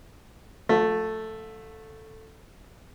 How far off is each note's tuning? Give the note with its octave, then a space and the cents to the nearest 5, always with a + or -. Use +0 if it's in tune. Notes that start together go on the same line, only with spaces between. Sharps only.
F3 +40 A3 +0 F4 +45